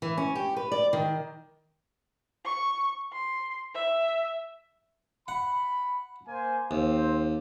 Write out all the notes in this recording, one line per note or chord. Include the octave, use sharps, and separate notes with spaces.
E3
C#4
G4
B4
D5
D#3
C#6
C6
E5
F#5 B5
A#3 C5 G#5
D#2 C4 C5